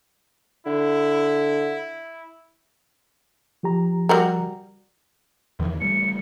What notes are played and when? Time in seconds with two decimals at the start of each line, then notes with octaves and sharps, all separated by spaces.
0.66 D3 E4
3.63 F3 G4 A#5
4.09 G3 F#4 A#4
5.60 E2 D#3 E3
5.81 E3 G3 A3 C#7